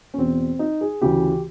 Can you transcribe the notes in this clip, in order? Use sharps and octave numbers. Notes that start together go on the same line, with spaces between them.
C#4
E2 B2 C4
D#4
G#4
D2 C#3 E3 G4